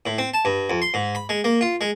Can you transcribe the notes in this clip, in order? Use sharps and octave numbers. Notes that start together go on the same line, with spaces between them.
A2
C4
A5
G2
F2
C6
G#2
B5
G#3
A#3
F4
G#3